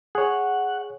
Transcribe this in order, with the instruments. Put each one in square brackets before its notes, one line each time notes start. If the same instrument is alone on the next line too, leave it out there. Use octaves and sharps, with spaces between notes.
[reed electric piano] G#4 C#5 [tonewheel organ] F#5